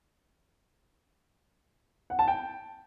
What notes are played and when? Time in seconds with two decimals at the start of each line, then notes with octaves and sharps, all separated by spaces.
2.10 F#5
2.19 A5
2.28 G5